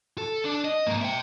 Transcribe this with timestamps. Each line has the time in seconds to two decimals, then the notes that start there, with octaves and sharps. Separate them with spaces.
0.18 A4
0.45 D4
0.65 D#5
0.86 G#2 A#3
1.01 E5 G5